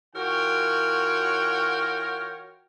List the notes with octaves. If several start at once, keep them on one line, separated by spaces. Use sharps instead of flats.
E3 F4 F#4 A#4 C#5 G5